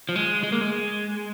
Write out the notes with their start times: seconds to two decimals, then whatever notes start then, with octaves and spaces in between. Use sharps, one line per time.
0.09 F3
0.16 G#3
0.43 G#3
0.52 A#3
0.61 G#3